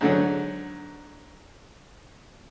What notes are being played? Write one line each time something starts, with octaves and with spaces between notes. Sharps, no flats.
G#2 D3 F#3